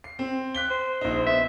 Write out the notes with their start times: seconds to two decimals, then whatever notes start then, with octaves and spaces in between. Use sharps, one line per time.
0.04 C7
0.19 C4
0.54 F#6 B6 G7
0.70 C5
1.01 A#1 D#4
1.26 B3 E5